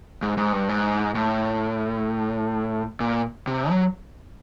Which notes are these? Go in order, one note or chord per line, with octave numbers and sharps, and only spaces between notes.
G#2
G#2
G2
G#2
A2
A#2
C3
F#3